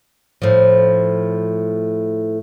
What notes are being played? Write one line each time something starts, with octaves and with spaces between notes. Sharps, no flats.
A2 F3